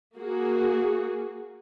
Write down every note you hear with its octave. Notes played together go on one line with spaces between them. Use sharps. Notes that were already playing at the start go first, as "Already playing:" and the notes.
A#3 F#4 G#4